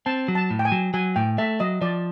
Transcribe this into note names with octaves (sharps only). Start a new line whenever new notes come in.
C4 A5
F#3
A5
A2
G5
G#5
F#3
F#3 G#5
A2 G5
A3 E5
F#3 D#5
F3 D5